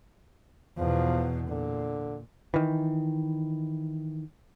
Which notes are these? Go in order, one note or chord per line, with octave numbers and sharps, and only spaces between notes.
E2 B2 F3
A#2 D3
D#3 E3